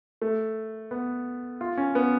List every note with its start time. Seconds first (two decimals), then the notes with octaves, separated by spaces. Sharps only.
0.22 A3
0.91 B3
1.61 F4
1.77 C#4
1.95 B3